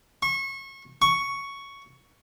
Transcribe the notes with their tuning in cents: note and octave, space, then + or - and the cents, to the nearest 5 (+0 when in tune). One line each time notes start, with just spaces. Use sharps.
C#6 -30
C#6 +5